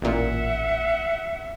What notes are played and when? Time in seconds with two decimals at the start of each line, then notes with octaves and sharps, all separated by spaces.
0.02 A1 A#2 E5 F#5